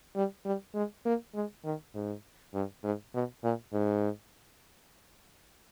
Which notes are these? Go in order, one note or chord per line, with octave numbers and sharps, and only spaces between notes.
G3
G3
G#3
A#3
G#3
D#3
G#2
G2
G#2
B2
A#2
G#2